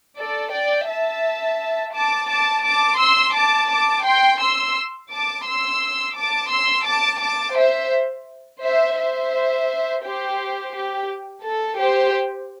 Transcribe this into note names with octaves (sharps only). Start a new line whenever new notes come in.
A4 D5
D5 G5
E5 A5
A5 D6
A5 D6
A5 D6
C6 E6
A5 D6
A5 D6
G5 C6
C6 E6
A5 D6
C6 E6
A5 D6
C6 E6
A5 D6
A5 D6
C5 E5
C5 E5
C5 E5
G4 C5
G4
A4
G4 C5